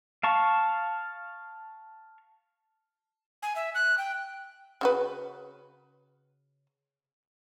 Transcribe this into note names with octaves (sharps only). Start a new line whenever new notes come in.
F5 A5 C#6
G#5
E5
F#6
G5
C#3 F#4 B4